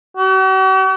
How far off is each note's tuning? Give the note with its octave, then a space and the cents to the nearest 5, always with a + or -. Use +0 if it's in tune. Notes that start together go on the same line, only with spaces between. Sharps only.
F#4 +45